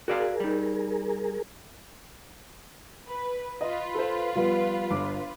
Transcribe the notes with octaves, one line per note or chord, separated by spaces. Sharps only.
F#4 G#4 A#4 D5 F5
G3 D#4
B4
F4 B4 D#5
A4 C5
F3 G3 B3
G1 D6